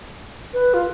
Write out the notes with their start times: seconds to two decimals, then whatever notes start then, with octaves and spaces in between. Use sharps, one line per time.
0.54 B4
0.74 F4